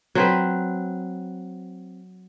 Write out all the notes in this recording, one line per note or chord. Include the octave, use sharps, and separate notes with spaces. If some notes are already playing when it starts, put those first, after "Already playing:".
F#3 C4 B4